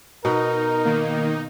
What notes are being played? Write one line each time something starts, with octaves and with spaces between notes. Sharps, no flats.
B2 D#4 A#4
D#3 A#3